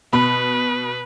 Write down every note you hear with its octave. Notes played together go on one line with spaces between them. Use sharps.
B2 B4 B5